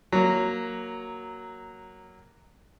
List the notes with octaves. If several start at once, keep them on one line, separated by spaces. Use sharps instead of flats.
F#3 A#3